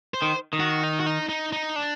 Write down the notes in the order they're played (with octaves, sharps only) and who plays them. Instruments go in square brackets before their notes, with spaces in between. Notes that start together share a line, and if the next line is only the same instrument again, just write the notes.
[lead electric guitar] C5
[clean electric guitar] D#3
D#3
[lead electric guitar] F#4
D#4
F#4
D#4
D#4
D#4
D4